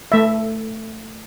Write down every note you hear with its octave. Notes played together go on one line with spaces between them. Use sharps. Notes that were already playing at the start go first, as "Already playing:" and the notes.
A3 E5